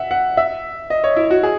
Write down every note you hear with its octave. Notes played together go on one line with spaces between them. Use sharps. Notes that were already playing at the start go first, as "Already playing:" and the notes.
Already playing: E5 F#5
F#5
E5
D#5
C#5
E4
F#4
G#4